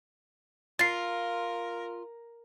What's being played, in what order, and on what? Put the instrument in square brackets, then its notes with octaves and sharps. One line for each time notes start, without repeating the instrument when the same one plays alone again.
[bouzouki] F4 [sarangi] A#4 [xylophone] A6 C7